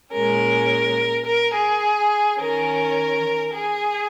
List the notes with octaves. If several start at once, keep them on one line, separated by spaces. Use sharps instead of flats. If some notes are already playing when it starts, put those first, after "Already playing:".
A#2 G#3 C#4 A#4
A#4
G#4
D#3 C#4 A#4
G#4